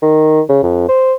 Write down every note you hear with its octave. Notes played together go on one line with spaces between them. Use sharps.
D#3
C#3
F2
C5